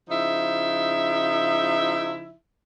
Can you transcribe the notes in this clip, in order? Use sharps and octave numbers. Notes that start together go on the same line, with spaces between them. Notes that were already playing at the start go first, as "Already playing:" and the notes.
C#3 F3 D#4 E4 E5